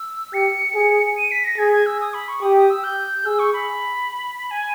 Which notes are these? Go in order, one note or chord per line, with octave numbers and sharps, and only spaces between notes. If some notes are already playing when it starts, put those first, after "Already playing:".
Already playing: E6
G4 C#7
G#4
C#7
D#7
B6
A#6
G#4 G#6
G#6
E6
D#6
B5
C#6
G4 D#6
D#6
E6
G6
G#4 E6
C#6
B5
G#5